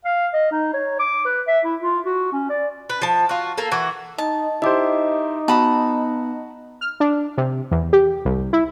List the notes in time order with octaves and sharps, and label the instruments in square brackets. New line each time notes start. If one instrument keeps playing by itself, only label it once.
[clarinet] F5
D#5
D#4
C#5
D6
B4
E5
E4
F4
F#4
C#4
D5
[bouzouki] B4
F3 A5
F4 F#4
A#3 A4
E3 F#4
[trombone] D#4 [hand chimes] D#5 [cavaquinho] A5
[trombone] D#4 [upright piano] E4 G4 C5 [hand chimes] D#5 D6
[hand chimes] B3 [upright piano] F#4 [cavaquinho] A5 B5 D#6
[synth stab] F6
D4
C3
E2
G4
C2
E4